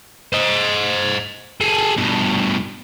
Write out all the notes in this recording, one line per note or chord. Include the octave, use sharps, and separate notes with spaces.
C5 D#5
G#4 A4
G2 B2